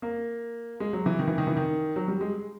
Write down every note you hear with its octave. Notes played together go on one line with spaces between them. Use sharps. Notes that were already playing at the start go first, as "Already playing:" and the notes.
A#3
G#3
F#3
E3
D#3
E3
D#3
E3
D#3
F#3
G3
G#3